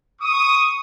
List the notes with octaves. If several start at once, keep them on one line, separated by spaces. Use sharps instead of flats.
C#6 D#6